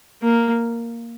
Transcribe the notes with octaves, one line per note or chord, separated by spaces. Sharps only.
A#3